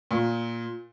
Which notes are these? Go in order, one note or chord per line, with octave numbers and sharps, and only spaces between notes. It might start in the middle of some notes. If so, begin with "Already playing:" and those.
A#2